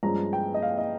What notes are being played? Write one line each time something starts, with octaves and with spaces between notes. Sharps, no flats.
G2 F3 G#3 C#4 A#5
G5
D#5
F5
D#5